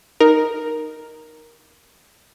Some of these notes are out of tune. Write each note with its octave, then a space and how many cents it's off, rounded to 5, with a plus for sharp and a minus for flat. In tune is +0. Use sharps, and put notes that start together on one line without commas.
D#4 +0 A#4 +10 A#5 +0